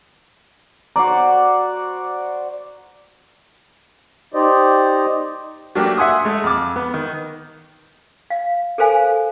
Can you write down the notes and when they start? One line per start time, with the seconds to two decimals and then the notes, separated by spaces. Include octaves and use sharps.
0.96 F#4 C5 D5 A#5
4.34 D#4 G4 C5 D5 D#5
5.75 F#3 A3 A#3 D4 G4
5.97 E5 F#5 G#5 C6 D#6
6.25 G#3 A3
6.44 F2 D6
6.76 B3
6.94 D#3
8.30 F5
8.78 A4 A#4 C5 F5 G#5